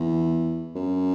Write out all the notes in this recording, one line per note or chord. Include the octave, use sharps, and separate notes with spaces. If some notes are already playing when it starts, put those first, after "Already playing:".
Already playing: E2
F#2